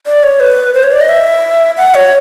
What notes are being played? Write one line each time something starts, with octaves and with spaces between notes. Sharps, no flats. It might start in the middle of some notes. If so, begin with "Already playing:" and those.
D5
C#5
B4
C5
C#5
D5
D#5
E5
F#5
C#5